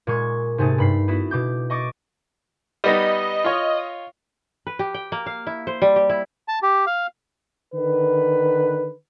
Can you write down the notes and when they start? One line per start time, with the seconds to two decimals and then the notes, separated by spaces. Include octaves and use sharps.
0.07 A#2 G#3 C#6 G#6
0.58 G#2 C3 A3 G#4 A6
0.78 G2 B5 C7
1.08 B3 E4 F#4
1.31 B2 D6 G6
1.70 D#5 C#6 D6 A6 D7
2.84 G3 B3 D#4 D#5
3.44 F4 C#5
4.67 B4
4.79 G4
4.94 G5
5.12 A#3
5.26 F5
5.47 E4
5.67 C5
5.82 G3
5.96 G4
6.09 E4
6.48 A5
6.63 G4
6.87 F5
7.74 D3 D#3 B4